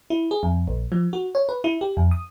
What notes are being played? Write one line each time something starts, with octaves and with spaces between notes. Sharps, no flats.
E4
G#4
F2
A#1
F3
F#4
C#5
B4
E4
G4
F2
D#6